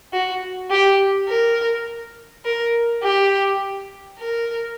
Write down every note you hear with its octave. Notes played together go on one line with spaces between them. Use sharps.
F#4
G4
A#4
A#4
G4
A#4